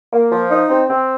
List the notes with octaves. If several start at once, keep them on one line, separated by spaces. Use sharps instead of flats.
A#3
F3
D#4
C4
C4